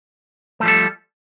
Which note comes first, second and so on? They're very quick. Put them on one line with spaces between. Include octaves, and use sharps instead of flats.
A3 F3 G3 A4